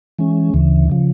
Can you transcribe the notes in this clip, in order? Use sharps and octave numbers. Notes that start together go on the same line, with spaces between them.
E3 G#3 C#4
D2 C#3 E3
C#3 F3